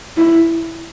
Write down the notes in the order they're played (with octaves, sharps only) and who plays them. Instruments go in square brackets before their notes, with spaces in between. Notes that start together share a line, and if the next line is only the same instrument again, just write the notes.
[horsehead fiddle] E4